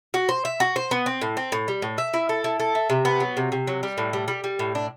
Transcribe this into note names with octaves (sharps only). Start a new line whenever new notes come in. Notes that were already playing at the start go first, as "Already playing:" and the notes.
F#4
C5
E5
F#4
C5
B3
C4
A2
C4
A2
G3
A2
E5
E4
A4
E4
A4
E5
C3
B3
F#3
C3
C3
F#3
G3
A2
G3
G3
G3
A2
D4